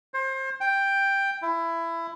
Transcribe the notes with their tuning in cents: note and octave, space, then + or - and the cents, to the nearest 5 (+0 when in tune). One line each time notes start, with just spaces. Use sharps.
C5 +30
G5 +5
E4 +20